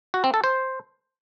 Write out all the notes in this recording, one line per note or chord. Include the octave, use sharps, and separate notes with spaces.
F#4
C4
A4
C5